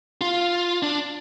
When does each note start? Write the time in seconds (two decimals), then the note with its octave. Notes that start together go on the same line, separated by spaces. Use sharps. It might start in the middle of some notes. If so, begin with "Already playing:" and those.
0.21 F4
0.83 D4